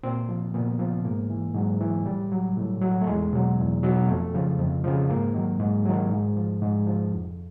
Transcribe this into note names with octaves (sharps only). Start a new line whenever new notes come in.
A#2 C4
F3
A#2 B3
F3
G#2 A#3
E3
G#2 F#3
E3
A2 G3
F#3
A2
F#3
A3
E2 G#3
B2 F#3
E2
B2 F#3
F2 A3
C#3 F3
F2
C#3 F3
G#2 A#3
D#3 F#3
G#2
D#3 F#3
G#2
F3
G#2
F3
F2